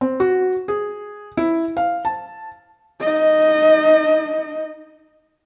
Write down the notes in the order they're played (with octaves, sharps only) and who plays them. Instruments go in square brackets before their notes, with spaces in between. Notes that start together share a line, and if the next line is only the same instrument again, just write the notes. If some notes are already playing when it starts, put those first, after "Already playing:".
[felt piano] C4
F#4
G#4
E4
F5
A5
[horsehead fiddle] D#4 D#5